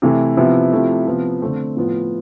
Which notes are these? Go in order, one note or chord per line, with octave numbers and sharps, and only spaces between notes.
C3 E3 A3 E4
C3 F3 B3 E4
C3 F3 A3 E4
C3 F3 B3
D3 A3 C4
A2 F3 B3 F4